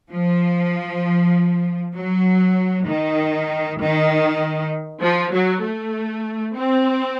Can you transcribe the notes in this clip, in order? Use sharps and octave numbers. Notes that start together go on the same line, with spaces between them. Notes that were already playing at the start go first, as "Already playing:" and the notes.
F3
F#3
D#3
D#3
F3
F#3
A3
C4